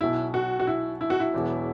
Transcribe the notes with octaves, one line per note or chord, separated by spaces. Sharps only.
B1 B2 F#3 E4
F#4
F#4
E4
E4
F#4
E4
E1 E2 B2 F#3 B3